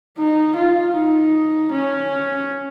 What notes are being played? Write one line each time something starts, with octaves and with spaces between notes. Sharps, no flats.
D#4
F4
D#4
C#4